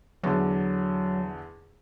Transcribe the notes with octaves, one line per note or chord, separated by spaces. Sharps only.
E2 D3 F#3